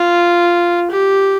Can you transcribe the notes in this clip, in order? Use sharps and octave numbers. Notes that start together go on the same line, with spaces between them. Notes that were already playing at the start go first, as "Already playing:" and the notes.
Already playing: F4
G4